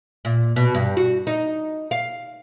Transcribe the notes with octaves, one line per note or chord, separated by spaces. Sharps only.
A#2
B2
G2
F#4
D#4
F5